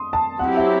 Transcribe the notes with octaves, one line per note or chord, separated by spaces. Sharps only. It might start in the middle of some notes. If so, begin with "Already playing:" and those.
Already playing: C6 D#6
A5
F#3 C4 E4 G4 F#5
E5